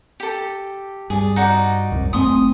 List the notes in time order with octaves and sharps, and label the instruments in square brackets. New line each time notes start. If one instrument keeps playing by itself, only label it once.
[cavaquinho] G4 A4
[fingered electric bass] G2 [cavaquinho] G#4 D5
[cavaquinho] D#4 F#4 D5
[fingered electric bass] C2 F#2
[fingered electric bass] F#1 A3 C4 [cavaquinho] G#5 C6 D#6